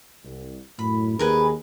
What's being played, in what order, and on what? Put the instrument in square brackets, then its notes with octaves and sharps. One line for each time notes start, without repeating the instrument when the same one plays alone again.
[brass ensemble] C2
[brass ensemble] F#2 A2 [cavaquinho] B5
[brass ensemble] D#2 [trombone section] G#4 [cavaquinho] A#4 B4 G#5